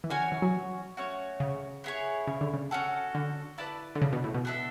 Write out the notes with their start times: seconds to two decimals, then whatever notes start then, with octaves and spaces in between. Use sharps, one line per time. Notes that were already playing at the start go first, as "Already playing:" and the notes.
0.04 E3
0.10 D3 C#4 F#4 C#5 G#5
0.32 E3
0.42 F#3
0.97 A3 C#4 F#4 C#5
1.40 C#3
1.84 B3 E4 G#4 C#5
2.27 C#3
2.41 D3
2.54 C#3
2.71 C#4 F#4 A4
3.15 D3
3.58 E4 B4 D5 A5
3.95 D3
4.02 C#3
4.13 B2
4.24 A2
4.34 B2
4.45 B3 D4 A4 E5